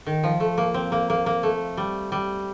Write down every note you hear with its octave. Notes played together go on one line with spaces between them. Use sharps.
D#3
F3
A3
A#3
C4
A#3
A#3
A#3
A3
G3
G3